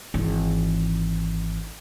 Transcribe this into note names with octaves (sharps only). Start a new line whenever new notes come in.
G#1 E3